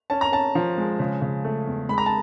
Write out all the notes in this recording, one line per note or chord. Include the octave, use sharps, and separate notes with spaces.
C#4 A5
A#5
C#4 A5
F3
G#3
C#3
C#3
A3
E2
G#3 B5
A#5
A5